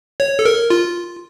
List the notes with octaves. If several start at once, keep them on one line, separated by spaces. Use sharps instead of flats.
C#5
A4
A#4
F4